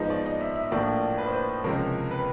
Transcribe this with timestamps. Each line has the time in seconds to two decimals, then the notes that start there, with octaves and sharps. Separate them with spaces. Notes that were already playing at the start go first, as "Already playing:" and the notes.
Already playing: G#2 F3 G#3 B3 D#4 C5
0.10 D5
0.26 D#5
0.41 E5
0.56 E5
0.71 A#1 A2 F3 A#3 D4 D5
1.18 B4
1.27 C5
1.36 B4
1.64 C#2 C3 F3 G#3 C#4 A#4
2.11 B4